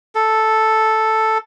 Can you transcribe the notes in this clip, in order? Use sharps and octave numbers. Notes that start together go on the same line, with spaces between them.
A4